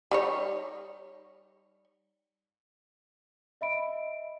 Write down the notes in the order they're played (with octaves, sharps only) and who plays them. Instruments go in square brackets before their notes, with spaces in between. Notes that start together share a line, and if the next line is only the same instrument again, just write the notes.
[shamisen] G3 D#4 C#5
[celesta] D#5 E5 B5 D7